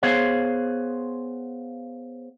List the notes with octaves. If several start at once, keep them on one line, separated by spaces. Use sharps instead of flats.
B3 G#4 C5 C#5 F5